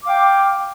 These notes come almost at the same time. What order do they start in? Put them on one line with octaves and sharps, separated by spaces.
D6 F5 G5